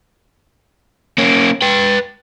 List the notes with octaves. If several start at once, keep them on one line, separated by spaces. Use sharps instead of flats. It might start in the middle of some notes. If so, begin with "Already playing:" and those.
A#3 C#4
B4 G5